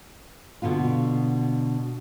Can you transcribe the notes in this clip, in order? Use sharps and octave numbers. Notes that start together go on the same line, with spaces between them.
B2 D3 B3 F4